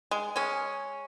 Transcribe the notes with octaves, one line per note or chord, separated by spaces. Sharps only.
G#3
G#3 C#4